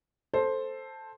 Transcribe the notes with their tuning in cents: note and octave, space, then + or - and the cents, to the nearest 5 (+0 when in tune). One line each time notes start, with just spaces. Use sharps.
A4 +0 C5 +5